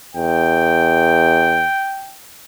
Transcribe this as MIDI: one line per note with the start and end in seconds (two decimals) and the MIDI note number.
0.16 1.67 40
0.16 2.16 79